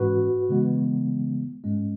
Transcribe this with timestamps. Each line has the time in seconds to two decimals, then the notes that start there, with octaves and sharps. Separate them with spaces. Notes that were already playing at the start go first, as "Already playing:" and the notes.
Already playing: G#2 E3 G#3 C#4 F#4 B4
0.49 C#3 E3 G#3 B3
1.64 G#2 G#3 C#4